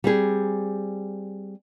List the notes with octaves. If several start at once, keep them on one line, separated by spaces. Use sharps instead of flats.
G3 C4 G#4